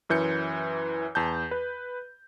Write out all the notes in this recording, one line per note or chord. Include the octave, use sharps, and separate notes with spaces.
F#2 E3 G6 C#7
E2 A5 G6
B4